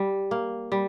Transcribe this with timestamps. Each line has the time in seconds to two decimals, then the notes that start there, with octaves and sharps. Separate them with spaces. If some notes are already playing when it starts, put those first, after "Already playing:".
Already playing: G3
0.31 A#3
0.72 G3